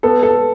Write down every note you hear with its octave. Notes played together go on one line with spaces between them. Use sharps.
B3 A4
A4